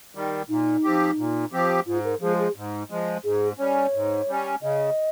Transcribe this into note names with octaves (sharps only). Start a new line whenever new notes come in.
D#3 G3
A#2 D#4
F3 C4 G4
A#2
F3 C4 G4
G#2 F4
A#4
F3 G#3 G#4
G#4
G#2
F3 G#3
G#2 G#4
G3 C#4 C#5
G#2
G3 C#4
C#3 D#5